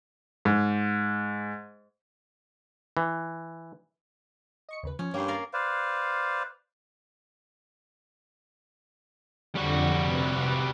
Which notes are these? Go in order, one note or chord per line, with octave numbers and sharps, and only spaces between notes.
G#2
E3
D#5 C#6 C#7
D#2 C#3 B4
F3 C#4
G2 A#3 C#5 G5 C6
A#4 F5 A6 C7
B4 C5 D5 F5
F2 D3 G3 F#4
C3 B4